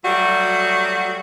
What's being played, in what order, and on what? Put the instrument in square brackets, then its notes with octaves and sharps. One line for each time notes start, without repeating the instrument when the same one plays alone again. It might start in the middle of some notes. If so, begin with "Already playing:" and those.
[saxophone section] F#3 G3 A3 F#4